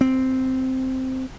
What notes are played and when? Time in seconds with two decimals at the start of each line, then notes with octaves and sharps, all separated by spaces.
0.01 C4